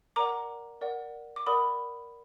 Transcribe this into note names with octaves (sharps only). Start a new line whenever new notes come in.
A#4 D5 F#5 A#5 D6
A#4 D5 F#5
D6
A#4 D5 F#5 B5 D#6